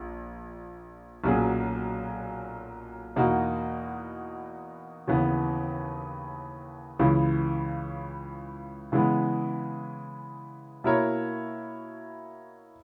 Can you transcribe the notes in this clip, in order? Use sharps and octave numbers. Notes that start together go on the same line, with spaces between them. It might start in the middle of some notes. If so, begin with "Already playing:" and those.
Already playing: A#1
B1 A#2 F#3 C#4 G#4
E2 B2 A#3 D#4 F#4
D#2 C#3 E3 B3
C#2 C#3 E3
C#3 E3 G#3 B3
B2 A#3 E4 A#4 C#5